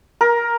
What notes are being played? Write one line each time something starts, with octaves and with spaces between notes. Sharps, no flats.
A#4